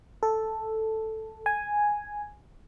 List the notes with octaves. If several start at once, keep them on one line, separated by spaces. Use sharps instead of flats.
A4
G#5